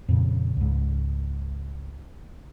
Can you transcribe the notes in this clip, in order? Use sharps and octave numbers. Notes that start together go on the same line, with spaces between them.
F2 A#2 C#3
C#2 G#2